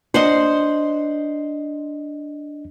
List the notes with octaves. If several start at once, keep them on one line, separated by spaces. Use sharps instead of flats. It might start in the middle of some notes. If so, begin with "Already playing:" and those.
D4 C5 D#5 F#5 C6